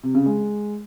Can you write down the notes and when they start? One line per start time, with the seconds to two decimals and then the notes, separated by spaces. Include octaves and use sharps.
0.03 C3
0.15 C#3
0.26 G#3